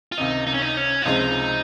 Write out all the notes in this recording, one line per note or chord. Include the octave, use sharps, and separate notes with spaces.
F4
C#2 C3 D#3 D#4
D#4
C#4
D#4
C#4
F4
C#2 C3 F3 G#3 D#4